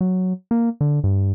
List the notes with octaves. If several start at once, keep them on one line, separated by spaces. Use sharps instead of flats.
F#3
A#3
D3
G2